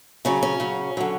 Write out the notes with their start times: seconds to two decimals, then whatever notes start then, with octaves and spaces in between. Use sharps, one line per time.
0.25 C#3 F#3 C#4
0.43 C#4
0.60 C#3 F#3
0.97 D3 F#3